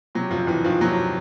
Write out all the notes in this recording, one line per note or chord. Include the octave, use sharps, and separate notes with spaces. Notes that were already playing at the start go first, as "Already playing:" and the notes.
C3 F#3
E1 F3
E1 E3
D#3 F3
C3 F#3